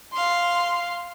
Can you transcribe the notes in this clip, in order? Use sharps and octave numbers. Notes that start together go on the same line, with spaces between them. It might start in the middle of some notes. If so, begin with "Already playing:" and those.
F5 C6